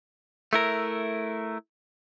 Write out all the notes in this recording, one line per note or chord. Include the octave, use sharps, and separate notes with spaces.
A3 E4 A#4